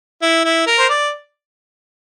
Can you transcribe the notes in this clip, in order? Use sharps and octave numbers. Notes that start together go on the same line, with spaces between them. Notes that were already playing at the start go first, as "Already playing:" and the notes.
E4
E4
A#4
C5
D5